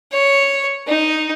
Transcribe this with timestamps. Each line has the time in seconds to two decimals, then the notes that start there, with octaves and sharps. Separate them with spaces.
0.12 C#5
0.87 D#4